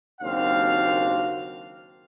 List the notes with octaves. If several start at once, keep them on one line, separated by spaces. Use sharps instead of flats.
F#1 D#2 C4 D4 F#4 F5